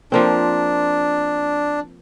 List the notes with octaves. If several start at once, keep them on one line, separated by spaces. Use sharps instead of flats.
F3 A#3 C4 D4